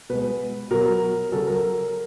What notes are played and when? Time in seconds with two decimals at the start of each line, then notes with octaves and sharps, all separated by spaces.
0.10 B2 G#3 B4
0.71 B2 F#3 A#4
1.32 C#3 F#3 A4
1.47 A#4